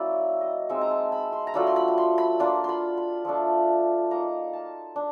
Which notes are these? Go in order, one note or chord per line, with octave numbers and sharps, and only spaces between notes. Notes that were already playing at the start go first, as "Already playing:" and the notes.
Already playing: F#3 A#3 C#4 E4 D5
D#5
G#3 C4 D#4 E5
A#5
A5
B5
C6
A#5
F#3 A3 D4 F4 B5
C6
B5
B5
C6
B5
A#3 D4 F4 C6
B5 C6
B5
F3 A3 D4
A#3 D#4 A#5
A5
D4